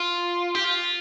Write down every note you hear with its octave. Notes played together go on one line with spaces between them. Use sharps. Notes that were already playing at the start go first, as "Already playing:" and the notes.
Already playing: F4
G4
F4